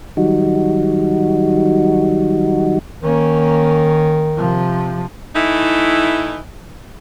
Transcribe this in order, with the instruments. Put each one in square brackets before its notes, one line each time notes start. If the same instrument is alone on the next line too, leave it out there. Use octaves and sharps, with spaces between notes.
[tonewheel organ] D#3 F#3 G3 D#4 F#4
[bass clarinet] D#3 [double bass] A#3 C#4
[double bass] C3 F3
[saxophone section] E3 A3 D#4 E4